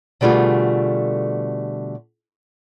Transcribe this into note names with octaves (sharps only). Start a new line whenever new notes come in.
B2 D3 G3 A3 F4 G#4